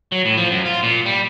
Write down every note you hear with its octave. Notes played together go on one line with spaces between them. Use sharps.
F#3
A2
F3
F#2
F4
A#2
G3